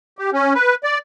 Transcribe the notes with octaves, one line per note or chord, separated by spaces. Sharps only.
G4
C#4
B4
D5